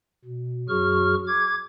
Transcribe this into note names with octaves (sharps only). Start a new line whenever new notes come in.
B2
F#2 F#3 F#4 G#4 C#6 F6
D6 G#6